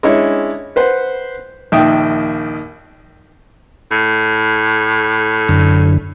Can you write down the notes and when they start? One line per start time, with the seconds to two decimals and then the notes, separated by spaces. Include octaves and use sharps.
0.03 G#3 C#4 D4 E4 C#5
0.76 B4 C5 F#5
1.72 A#1 D#2 D#3 E5 G5 D#6
3.91 A2
5.49 F#2 D3